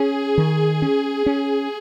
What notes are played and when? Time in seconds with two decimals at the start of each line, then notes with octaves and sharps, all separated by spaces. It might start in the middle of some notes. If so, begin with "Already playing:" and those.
Already playing: C#4 G#4
0.38 D#3
0.82 C#4
1.26 C#4